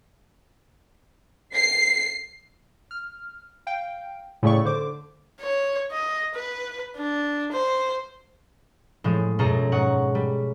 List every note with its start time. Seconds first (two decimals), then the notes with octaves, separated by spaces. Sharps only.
1.55 C7
2.91 F6
3.67 F5 G5
4.43 A2 C#3 A3 D5 C#6
4.65 D3 C5 D6
5.40 C#5
5.92 D#5
6.35 B4
6.97 D4
7.52 C5
9.04 A2 F3 G#3
9.39 F#2 B2 F4 G#4 A4 A#5
9.72 G#2 C#5 F#5 C#6 F#6
10.15 G3